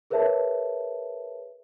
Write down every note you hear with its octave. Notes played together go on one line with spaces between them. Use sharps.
G#4 A#4 B4 C#5 E5 A5